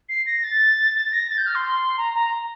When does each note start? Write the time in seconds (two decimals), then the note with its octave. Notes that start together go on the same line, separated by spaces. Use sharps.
0.09 C7
0.26 A#6
0.44 A6
0.95 A6
1.12 A#6
1.30 A6
1.38 G6
1.46 F6
1.55 C6
1.98 A#5
2.15 A#5